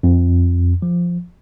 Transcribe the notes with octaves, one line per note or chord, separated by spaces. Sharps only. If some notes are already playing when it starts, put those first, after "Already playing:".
F2
F3